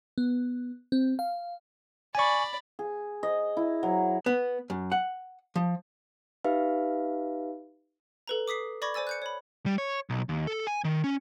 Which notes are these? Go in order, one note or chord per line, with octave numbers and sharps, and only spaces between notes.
B3
C4
F5
D5 G#5 B5 C#6
G#4
D#5
E4
F#3
B3
F#2
F#5
F3
D#4 G4 B4 E5 F5
A4 B4 A#5
D6 D#6 B6 C7
D5 B5 C#6 D6 G#6 A#6
C5 D5 G#5 E6 A6
F#6 G6 C#7
C#5 B5
G3
C#5
B1
D#2
A4
G#5
D#3
C#4